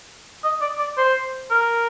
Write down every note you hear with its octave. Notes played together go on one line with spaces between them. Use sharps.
D#5
D5
D5
C5
A#4